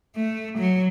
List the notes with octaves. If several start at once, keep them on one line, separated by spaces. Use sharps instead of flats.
A3
F#3